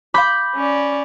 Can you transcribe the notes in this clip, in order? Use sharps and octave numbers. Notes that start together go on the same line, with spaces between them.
F5 B5 C6 D6 G6
C#4 D5